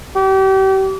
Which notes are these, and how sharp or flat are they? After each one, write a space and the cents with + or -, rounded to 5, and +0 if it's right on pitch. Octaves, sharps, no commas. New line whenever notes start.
G4 -35